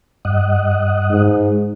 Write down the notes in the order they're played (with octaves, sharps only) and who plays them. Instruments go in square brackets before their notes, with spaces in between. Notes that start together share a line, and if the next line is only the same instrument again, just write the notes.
[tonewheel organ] G2 D#5 F#5
[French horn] G#2